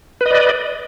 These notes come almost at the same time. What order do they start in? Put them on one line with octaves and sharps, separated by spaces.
B4 D#5 D5